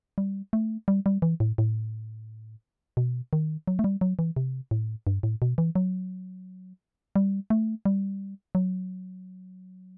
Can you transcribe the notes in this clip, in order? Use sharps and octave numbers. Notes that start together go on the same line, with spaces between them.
G3
A3
G3
G3
E3
A2
A2
B2
D#3
F#3
A3
G3
F#3
E3
C3
A2
G2
A2
B2
E3
F#3
G3
A3
G3
F#3